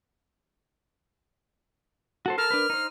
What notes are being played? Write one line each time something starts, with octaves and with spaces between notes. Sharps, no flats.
F#4 A4 C5
A4 A#4 A5 F6
D4 A#4 B4
D#4 C5